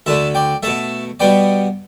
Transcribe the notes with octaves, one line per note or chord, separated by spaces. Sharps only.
D2 D3 A3 E5 A5
D5 G5
B2 A3 E5 A5
B2 G3 B3 D5 G5